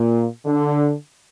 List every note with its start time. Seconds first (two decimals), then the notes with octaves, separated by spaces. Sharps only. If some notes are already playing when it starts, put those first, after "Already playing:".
Already playing: A#2
0.46 D3